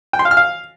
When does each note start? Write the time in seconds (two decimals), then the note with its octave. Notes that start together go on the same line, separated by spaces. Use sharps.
0.13 G5
0.19 C6
0.25 F5
0.31 F6
0.37 F5